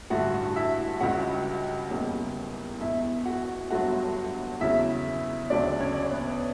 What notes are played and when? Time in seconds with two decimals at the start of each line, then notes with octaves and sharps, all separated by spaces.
0.10 A1 G2 D3 A3 F#4 F#5
0.56 E4 E5
1.01 C#2 C#3 G3 F#4 F#5
1.91 F#1 E2 C#3 G3
2.81 E1 E2 B2 E4 E5
3.25 F#4 F#5
3.70 G1 G2 F#3 A3 F#4 F#5
4.60 E2 C#3 F#3 E4 E5
5.50 D2 C#3 F#3 A3 D4 D5
5.80 C#4 C#5
5.95 D5
6.03 C#5
6.11 B3 B4